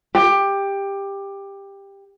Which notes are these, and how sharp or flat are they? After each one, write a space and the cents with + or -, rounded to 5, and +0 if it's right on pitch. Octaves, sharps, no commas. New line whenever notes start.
G4 +15